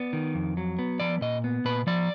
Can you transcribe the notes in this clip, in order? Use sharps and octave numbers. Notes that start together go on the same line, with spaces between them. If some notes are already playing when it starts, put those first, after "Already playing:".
Already playing: B3 D5
D#3
F2
F#3
B3
F3 D5
A#2 D#5
B3
A#2 B4
F3 D5